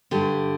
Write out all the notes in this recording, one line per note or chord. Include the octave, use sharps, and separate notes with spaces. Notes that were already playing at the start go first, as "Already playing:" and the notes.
G2 D3 G4